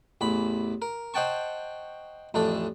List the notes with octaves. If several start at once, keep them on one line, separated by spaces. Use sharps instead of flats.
A1 E2 B5
A#4
C5 D#5 F#5 G5 A5 C#6
A1 F2 A3 D4 A4